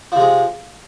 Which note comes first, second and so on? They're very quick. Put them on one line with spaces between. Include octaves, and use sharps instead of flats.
F3 C3 G#3